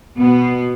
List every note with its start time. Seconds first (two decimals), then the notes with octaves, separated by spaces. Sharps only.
0.17 B2 B3